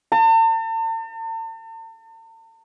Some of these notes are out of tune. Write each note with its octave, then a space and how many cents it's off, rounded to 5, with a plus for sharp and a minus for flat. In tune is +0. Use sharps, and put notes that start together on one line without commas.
A5 +45